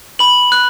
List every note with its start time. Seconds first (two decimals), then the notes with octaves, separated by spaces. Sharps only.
0.19 B5 F#7
0.52 F#6